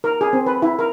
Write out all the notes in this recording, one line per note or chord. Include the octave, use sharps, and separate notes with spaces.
A#4
G#4
C4
B4
E4
A#4